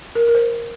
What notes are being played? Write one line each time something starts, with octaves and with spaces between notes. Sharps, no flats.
A#4
A#4
C5